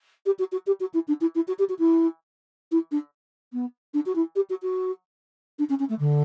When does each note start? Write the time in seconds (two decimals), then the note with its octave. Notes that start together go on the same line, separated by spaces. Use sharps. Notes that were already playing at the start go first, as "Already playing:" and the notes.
0.26 G4
0.39 F#4
0.52 F#4
0.67 G4
0.80 F#4
0.94 E4
1.08 D4
1.21 E4
1.35 E4
1.48 F#4
1.59 G4
1.69 F#4
1.79 E4
2.72 E4
2.92 D4
3.53 B3
3.94 D4
4.06 F#4
4.15 E4
4.36 G4
4.50 F#4
4.63 F#4
5.59 D4
5.69 C#4
5.79 C#4
5.89 A3
5.99 D3